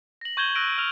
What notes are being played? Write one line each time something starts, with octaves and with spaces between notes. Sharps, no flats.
A#6 F#7
C#6 G6 G#6 E7 G7
E6 F#6 A#6 D7 D#7
F6 F7